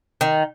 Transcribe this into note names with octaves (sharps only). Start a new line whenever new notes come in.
D#3